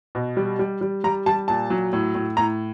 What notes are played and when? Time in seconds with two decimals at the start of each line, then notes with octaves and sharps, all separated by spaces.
0.15 B2
0.37 G3
0.59 G3
0.81 G3
1.04 G3 A#5
1.26 G3 A5
1.48 A#2 A5
1.70 F#3
1.93 A2
2.15 A2
2.37 A2 A#5